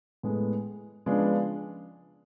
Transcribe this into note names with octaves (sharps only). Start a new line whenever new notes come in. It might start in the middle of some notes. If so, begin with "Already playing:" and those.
A2 G#3 B3
C#3 F3 G#3 B3 D4